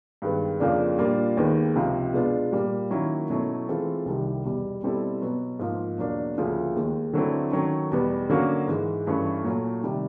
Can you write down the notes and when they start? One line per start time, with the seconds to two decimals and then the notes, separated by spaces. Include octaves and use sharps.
0.22 G2 D#3 G#3 B3
0.60 F2 C#3 F3 A#3 D4
0.99 A#2 G3 A#3 D4 F4
1.37 D#2 D#3 G#3 B3
1.75 C#2 C3 F3
2.13 B2 G#3 B3 D4 F4
2.52 A#2 G3 A#3
2.90 D#3 F#3 A#3 C#4 E4
3.30 B2 F#3 A3 C#4 E4
3.68 E3 G#3 C4 F4 A4
4.06 C2 C3 D#3 G3
4.45 E2 B2 G3
4.83 B2 G3 C4 E4 A4
5.21 B2 F#3 B3
5.60 G#2 F3 A#3
5.98 E2 B2 F#3 A#3 D4
6.38 D2 C#3 F3 A#3
6.76 D#2 D#3 G#3
7.13 D3 F#3 A3 C4 E4
7.52 D#3 F#3 A3 C#4
7.92 E2 B2 G3 B3
8.30 D3 F#3 A#3 C#4 F#4
8.67 G#2 E3 G#3
9.07 G2 E3 A3 C#4
9.44 A#2 F#3 A3
9.83 C3 D#3 G3